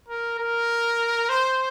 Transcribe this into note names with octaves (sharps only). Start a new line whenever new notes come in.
A#4
A#4
C5